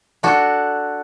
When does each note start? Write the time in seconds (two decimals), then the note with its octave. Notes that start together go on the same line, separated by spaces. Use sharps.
0.23 D4 F#4 A4